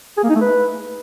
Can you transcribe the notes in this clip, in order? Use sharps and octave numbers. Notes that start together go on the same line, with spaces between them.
G#4
A#3
D#4
A3
B4